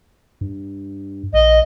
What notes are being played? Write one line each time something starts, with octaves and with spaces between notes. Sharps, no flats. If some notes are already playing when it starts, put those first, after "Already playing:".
G2
A#1 D#5